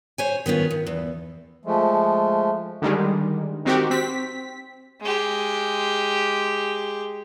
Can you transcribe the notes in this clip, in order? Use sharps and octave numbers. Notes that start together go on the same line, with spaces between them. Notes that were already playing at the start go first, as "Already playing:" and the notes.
C5 C#5 G#5
D#3 B3 C#4 F4
D#3
E2
F3 G#3 A3
D3 D#3 G3 G#3
D#3 C4 F#4 G4
C4 B6
G#3 G4